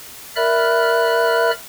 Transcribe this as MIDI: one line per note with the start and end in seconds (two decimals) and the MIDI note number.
0.36 1.51 70
0.36 1.51 74
0.36 1.51 76
0.36 1.51 83
0.36 1.51 89
0.36 1.51 90